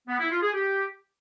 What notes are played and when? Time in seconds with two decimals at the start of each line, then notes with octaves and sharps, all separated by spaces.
0.08 B3
0.19 E4
0.31 F4
0.42 G#4
0.53 G4